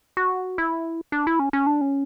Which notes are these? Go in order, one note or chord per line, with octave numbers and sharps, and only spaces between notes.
F#4
E4
D4
E4
C#4
C#4
D4
C#4